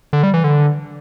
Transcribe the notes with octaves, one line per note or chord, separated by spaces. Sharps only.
D3
G3
E3
D3